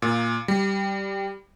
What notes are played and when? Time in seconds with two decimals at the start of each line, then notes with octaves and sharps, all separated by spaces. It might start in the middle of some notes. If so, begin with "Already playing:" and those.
0.02 A#2
0.48 G3